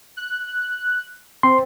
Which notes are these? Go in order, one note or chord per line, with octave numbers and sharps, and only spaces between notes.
F#6
C4 C6